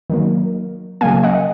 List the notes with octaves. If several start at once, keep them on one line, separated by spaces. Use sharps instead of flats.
D#3 F#3 A#3
C#3 F#3 A#3 F5 G#5
D#5 F#5